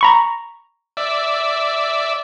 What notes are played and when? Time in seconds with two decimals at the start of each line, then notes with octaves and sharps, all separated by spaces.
0.01 A#5 B5 C#6
0.97 D5 E5